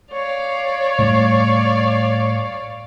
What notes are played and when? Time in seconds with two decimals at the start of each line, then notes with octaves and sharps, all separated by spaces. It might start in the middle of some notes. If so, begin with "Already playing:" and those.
0.12 C#5 D5 F5
0.99 A2 G3